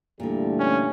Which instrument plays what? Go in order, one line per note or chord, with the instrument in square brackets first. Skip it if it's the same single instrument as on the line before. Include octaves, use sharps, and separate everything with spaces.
[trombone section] E2 G3 A3 [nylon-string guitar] A#2 D3
[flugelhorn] C#4